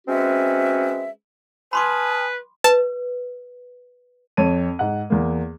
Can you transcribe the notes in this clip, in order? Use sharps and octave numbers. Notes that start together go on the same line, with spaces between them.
G#3 C4 C#4 F#4 B4 E5
B4 G#5 A5 B5 C6 D6 D#6 F6
B4 A5
F2 C#5 A5 D#7
G#2 F#5
E2 A#3